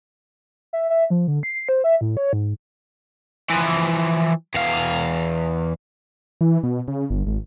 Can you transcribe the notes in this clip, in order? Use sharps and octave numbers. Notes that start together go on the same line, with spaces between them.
E5
E5
F3
D3
C7
C5
E5
A2
C#5
G#2
E3 F3
E2 F5
E3
B2
C#3
G1
G#1